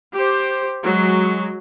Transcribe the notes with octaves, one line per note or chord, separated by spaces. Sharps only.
G4 C5
F#3 G#3